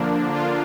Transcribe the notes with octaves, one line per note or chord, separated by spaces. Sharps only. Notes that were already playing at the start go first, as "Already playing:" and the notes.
Already playing: D3 F3 A#3 D4
F4